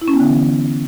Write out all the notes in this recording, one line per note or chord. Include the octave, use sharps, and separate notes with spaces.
E4
C#4
B3
D3
E3